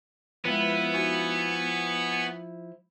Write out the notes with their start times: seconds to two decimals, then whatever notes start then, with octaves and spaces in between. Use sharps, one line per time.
0.45 F3 G#3 B3 E4 B4 G5
0.94 D#4 F#4 G#5 C#6